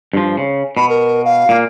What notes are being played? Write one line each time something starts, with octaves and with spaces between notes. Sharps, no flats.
G2 F3
C#3
B2 B5
A#4
F5
A#2 A#3